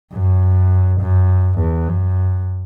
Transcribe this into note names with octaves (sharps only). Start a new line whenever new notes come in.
F#2
F#2
E2
F#2